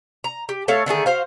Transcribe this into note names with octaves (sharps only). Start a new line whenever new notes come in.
A#5
G4
A3 A4 C#5 F5
D3 D#3 A3 G#4
F#4 C5 F5